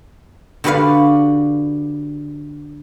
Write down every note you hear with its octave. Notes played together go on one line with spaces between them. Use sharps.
D3 F#4 G4 B4 D5 F5